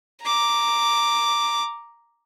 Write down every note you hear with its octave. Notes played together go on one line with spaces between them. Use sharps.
A#5 D6